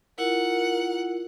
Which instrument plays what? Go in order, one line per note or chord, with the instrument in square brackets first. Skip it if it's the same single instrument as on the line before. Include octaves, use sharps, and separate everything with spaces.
[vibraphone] E4 F4 [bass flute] A#4 [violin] F#5